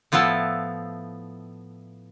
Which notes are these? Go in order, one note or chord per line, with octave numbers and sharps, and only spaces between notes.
A2 F3 B3 E4 A4